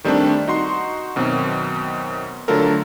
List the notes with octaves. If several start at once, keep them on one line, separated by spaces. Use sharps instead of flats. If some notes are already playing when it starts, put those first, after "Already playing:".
D#3 G3 A3 C4 D4
D#4 F#4 C6
F#2 B2 D#3 C4
D3 F#3 A3 F4 A4 A#4